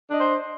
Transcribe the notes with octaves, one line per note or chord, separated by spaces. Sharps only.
D4 C5 D#5